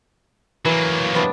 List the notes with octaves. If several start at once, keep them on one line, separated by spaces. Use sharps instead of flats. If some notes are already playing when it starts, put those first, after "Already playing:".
E3 F#3 A#3
C3 B3 D4